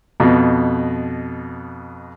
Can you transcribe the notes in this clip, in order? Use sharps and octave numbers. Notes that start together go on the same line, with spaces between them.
F2 B2